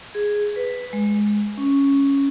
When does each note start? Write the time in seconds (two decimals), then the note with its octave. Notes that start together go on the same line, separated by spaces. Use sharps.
0.15 G#4
0.56 B4
0.93 G#3
1.58 C#4